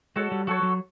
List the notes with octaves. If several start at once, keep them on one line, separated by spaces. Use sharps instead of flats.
G#3 F#4 A4 C#5
G3
F#3 F#4 A4 C#5
F#3